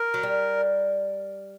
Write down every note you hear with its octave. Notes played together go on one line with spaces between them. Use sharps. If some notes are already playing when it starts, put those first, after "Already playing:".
Already playing: A#4
F#3
G3